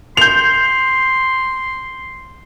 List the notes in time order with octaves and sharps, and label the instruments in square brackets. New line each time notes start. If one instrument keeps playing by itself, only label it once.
[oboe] C6 [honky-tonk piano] G6 F7